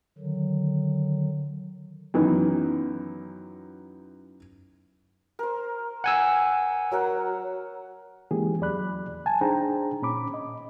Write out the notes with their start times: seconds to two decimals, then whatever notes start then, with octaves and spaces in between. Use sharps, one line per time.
0.18 D3 D#3 F#3
2.14 F#2 D#3 E3 B3 D#4
5.39 A#4 C5
6.04 F#5 G#5 E6
6.92 F#3 A#4 F#5
8.31 E3 G#3 A#3 C#4 G4 G#4
8.61 E2 F#3 D5 B5 F#6
9.26 G#5 A5
9.41 D4 D#4 G#4 C5 G5 A#5
10.02 A#2 C#4 B5 D6
10.34 D#5